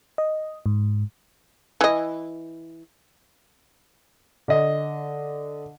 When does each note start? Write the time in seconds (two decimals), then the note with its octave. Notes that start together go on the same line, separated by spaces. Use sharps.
0.18 D#5
0.66 G#2
1.81 E3 D#5
4.48 D3 D#5